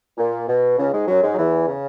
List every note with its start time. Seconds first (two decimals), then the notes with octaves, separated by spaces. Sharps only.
0.18 A#2
0.48 B2
0.78 C#2 C#3
0.93 G#2 G#3
1.08 F#2 F#3
1.23 G#2 G#3
1.34 F#3
1.39 E2 E3
1.68 C#3